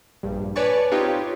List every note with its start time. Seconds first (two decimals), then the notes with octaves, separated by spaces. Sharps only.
0.23 A#1 G2
0.56 B4 C#5 D5 G#5 A5 C#6
0.91 C4 D#4 F4 G4 B4 C#5